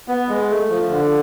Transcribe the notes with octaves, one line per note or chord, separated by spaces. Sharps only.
B3
G#3
A3
F3
D3